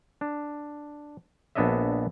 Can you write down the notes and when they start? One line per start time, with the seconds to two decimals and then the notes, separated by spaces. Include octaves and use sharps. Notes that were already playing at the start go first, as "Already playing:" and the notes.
0.21 D4
1.55 A#1 B3 D4 C#5 D#5 E5